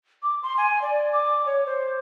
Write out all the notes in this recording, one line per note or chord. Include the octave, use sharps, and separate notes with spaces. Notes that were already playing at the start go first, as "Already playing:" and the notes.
D6
C6
G#5
D5
D6
C#5
C5